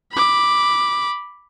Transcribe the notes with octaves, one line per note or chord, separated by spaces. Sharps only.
B5 D6